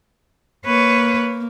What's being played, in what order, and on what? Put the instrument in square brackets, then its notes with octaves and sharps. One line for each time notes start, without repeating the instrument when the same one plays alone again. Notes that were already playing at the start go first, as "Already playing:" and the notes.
[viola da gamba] A#3 [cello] B4 C#5